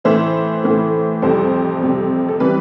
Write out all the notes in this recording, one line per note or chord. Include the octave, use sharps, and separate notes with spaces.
A2 E3 A3 C5 E5
A2 E3 A3
F2 C3 G3 A4 C5
F2 C3 G3
A4
C3 E3 G3 B4